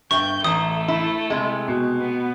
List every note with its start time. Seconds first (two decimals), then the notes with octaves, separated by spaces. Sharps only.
0.11 G1 E5 G5 C#6 G6
0.44 A1 A3 A#5 D#6
0.88 E4
1.30 C3 G#3 E4
1.68 B2
1.99 B3